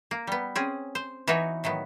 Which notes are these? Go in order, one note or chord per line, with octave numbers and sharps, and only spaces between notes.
A#3
G3 B3
C4 C#4 G#4
C5
E3 B3 D#4 F#4 B4 C#5
A2 D#3 F#3 B3